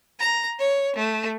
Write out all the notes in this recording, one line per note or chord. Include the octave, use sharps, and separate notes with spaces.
A#5
C#5
A3